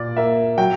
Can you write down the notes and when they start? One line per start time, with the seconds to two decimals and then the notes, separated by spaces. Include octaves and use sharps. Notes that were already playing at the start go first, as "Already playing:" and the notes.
Already playing: A#2 D5
0.17 A#3 E5
0.58 F#3 G5